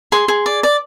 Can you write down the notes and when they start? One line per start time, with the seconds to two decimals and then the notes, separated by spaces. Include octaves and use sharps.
0.12 G#4 C6
0.28 G#4
0.46 D5
0.63 D5